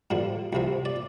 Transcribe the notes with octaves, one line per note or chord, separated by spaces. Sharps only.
G2 D3 F3
C2 C3 F3
D5